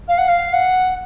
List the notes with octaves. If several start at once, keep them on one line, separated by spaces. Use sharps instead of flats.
F5
F#5
F5
F#5